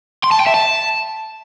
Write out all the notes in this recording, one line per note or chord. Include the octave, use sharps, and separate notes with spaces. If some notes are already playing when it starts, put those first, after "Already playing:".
C6
A5
G5
E5
A5